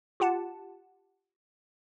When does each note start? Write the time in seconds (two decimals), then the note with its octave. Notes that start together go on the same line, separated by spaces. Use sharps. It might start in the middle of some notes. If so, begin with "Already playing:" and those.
0.20 F4 G4 F#5 A5